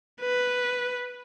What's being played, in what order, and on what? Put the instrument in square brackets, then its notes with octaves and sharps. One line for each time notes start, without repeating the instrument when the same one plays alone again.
[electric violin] B4